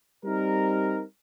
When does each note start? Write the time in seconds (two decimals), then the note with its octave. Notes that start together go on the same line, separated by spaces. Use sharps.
0.24 G3 C4 D#4 A#4